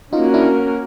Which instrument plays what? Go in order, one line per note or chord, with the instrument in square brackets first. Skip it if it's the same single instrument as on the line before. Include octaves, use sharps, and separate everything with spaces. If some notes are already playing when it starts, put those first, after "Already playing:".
[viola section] A#3 C#4 F#4 A#4 [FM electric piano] D#4 F4
[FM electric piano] D4 E4